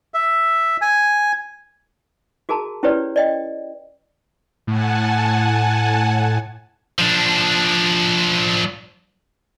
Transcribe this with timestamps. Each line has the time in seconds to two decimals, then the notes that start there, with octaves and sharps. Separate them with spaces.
0.14 E5
0.82 G#5
2.49 F#4 G#4 A#4 A5 A#5
2.83 C#4 E4 G4 B4 C#5 D5
3.16 D5 D#5 G5
4.67 A2 F#5 G#5 A5
6.99 F3 D4